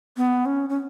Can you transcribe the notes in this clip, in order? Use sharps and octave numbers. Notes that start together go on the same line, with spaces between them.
B3
C#4
C#4